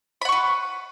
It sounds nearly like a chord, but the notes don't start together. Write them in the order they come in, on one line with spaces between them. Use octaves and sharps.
B5 F#5 C#6 B4